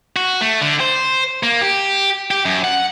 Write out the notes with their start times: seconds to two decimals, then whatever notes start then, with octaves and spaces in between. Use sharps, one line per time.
0.16 F#4
0.41 A3
0.62 D3
0.80 C5
1.43 A#3
1.62 G4
2.31 G4
2.45 F#2
2.64 F#5